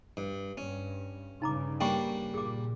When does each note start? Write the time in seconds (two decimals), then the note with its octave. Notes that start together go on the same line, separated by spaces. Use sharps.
0.17 G2
0.58 G2 C#4
1.42 G2 C#3 D#4 A#5 D6
1.81 G3 A#3 D4 G5 C#6
2.34 A#2 G#4 D6